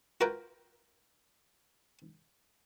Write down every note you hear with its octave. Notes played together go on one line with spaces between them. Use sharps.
F4 F#4 A#4 B4 G5